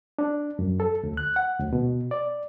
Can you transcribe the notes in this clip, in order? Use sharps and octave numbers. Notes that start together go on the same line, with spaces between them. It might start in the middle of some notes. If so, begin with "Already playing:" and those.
D4
F#2
A4
D2
F#6
F#5
D2
B2
D5